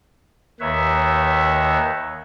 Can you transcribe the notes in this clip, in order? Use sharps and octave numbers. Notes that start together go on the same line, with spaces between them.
D#2 D#3 B4 C#5 E5